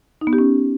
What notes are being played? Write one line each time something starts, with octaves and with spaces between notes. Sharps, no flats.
D#4
B3
G4
C#4